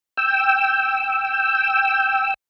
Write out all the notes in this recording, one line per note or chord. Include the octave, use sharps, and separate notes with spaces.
G5 E6